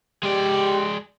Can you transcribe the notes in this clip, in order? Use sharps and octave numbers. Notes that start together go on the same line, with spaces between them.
G#3 G4 D5